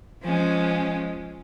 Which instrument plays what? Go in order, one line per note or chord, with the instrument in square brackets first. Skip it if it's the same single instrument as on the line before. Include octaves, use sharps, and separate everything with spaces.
[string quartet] F3 G#3 C#4